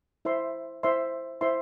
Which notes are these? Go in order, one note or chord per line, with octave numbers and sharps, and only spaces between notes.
E4 C5 E5 C6
E4 C5 E5 C6
E4 C5 E5 C6